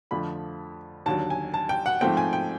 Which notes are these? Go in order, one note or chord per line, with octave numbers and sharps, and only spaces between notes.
F2 D3 F3 A3 B5
D#2 D3 F#3 A5
G#5
A5
G5
F#5
G#2 F3 A3 C4 G5
G#5
G5